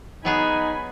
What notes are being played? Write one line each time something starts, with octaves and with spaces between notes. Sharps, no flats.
F#3 B3 D#4 G#4 G#5 B5